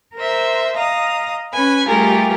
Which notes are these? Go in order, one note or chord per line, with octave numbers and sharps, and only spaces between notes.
A#4 C5 E5
D#5 F5 A#5 D#6
C#4 B4 G#5 B5
G3 A3 F4 G4 G#4 A#4